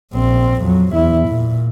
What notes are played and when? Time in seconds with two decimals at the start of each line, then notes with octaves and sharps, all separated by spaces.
0.13 A#1 C4
0.61 F2 F#3
0.93 E2 E4
1.29 A#2